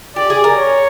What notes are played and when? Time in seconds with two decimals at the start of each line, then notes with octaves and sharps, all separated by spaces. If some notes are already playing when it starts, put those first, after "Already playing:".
0.16 G4 D5
0.30 G#4
0.44 A#4
0.57 C#5